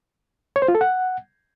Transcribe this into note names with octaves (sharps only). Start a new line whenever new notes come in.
C#5
C5
F4
A4
F#5